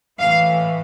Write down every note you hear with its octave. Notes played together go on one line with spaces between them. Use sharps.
A2 E3 A3 F5